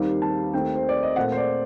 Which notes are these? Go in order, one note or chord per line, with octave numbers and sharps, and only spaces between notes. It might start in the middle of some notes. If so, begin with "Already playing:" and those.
Already playing: D#2 D#3 G3 C4
A5
D#2 D#3 A3 C4 G5
C5
D5
D#5
A#2 A3 C4 F#5
C5
D5